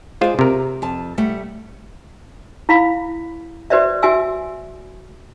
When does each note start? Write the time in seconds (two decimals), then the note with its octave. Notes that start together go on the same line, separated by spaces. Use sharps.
0.21 G#3 F4 G#4 C5 D5
0.39 C3 A#4
0.82 F2 A5
1.18 G3 A3 F#5
2.69 E4 F5 B5
3.70 F#4 B4 C5 D5 E5
4.03 F#4 E5 G#5 E6